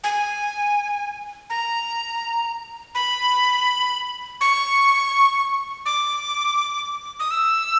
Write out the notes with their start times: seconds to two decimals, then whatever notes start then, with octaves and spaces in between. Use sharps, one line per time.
0.04 G#5
1.50 A#5
2.95 B5
4.41 C#6
5.86 D6
7.20 D#6
7.31 E6